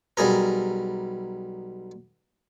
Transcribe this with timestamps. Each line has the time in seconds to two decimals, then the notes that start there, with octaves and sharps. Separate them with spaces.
0.17 B1 G3 G#4 A#4